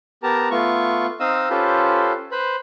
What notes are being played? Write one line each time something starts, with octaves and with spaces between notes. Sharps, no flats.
B3 G4 A#4 A5 A#5
A3 B3 F4 C#6
C4 D#4 D#5 F5 D#6 E6
C#4 F4 G4 A4 B4 C5
B4 C5 B5